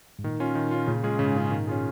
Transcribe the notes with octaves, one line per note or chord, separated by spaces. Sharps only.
G#2
A#2 D#3
C#4 F4
D#3
C#4 F4
A#2 C#3
G#3 C#4 F4 G#4
G#2 C#3
G#3 C#4 F4 G#4
D#3
C#4 F4 G#4